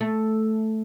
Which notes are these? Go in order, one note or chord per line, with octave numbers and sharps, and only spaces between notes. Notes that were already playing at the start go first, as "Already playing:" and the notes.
A3